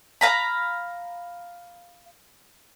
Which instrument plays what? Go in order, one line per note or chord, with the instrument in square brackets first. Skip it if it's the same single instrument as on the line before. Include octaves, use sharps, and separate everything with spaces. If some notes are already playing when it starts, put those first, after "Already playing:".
[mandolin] F5 A#5 B5